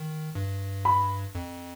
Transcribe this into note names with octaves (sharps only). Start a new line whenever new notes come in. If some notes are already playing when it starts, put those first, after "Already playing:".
Already playing: D#3
G2
B5
F2